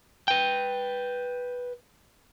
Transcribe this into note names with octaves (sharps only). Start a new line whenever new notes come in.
B4 G5